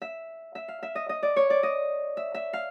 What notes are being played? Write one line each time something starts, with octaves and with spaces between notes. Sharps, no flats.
E5
E5
F5
E5
D#5
D#5
D5
C#5
D5
D#5
E5
E5
F5